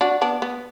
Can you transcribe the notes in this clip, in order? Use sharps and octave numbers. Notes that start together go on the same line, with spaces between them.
D4 F#4
B3 D4
B3